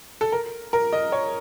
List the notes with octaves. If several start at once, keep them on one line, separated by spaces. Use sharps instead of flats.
A4
A#4
A#4
D#5
C#5